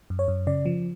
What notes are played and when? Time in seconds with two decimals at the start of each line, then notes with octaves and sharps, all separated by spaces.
0.10 F#2
0.19 C#5
0.28 F#2
0.47 C#3 D5
0.66 F3